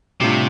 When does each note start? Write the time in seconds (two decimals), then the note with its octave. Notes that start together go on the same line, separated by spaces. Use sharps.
0.21 A2 C3 G3 D4 F4